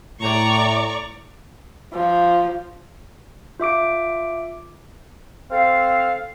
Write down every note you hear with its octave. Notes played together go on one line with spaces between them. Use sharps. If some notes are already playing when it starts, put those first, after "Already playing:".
A2 D5 A#5 C#6
F3
F4 E5 D6 D7
C4 A4 F5